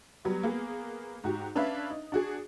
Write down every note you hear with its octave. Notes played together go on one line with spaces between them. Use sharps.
F#3 G3 B3
A#3 B3 G#4
G#2 F#4 G4
C#4 D4 B4 E5 F5
D#4
D4 F#4 G#4